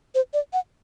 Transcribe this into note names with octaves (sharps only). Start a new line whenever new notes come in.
C5
D5
F#5